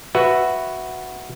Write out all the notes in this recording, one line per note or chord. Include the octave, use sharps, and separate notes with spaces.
F#4 B4 E5